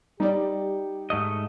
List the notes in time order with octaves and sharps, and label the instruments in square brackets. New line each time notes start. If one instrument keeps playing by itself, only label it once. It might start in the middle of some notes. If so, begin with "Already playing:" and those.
[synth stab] G3 [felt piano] D#4 D5 [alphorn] G4
[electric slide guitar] G#2 A3 D#5